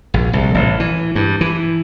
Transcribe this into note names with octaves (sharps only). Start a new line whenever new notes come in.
A#1
C2
A1
E3
G2
E3